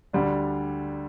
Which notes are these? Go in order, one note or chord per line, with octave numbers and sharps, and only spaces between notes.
D2 D3 G3 D4